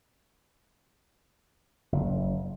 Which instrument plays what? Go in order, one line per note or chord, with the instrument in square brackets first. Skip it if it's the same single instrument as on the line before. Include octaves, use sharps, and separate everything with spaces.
[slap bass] F#1